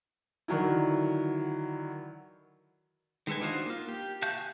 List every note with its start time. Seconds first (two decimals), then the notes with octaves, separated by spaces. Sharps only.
0.48 D3 D#3 F#3 E4
3.27 D#3 G#3 A4 B4 G#5
3.40 D4 D#4 F4 F#4 C5
3.66 A#3 F4
3.88 G4
4.22 F#4 E5 F5 A5 G6
4.35 G#5